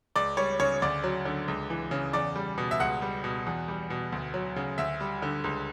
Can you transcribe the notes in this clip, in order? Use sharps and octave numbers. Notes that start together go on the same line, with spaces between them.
C#2 D5
G3 C#5
C#3 C#5
D2 D5
F#3
D3
C#2
E3
C#3
E2 D5
G3
B2
E5
C#2 F#5
G3
B2
E2
G3
B2
D2
F#3
C#3
D2 E5
G3
D3
C#2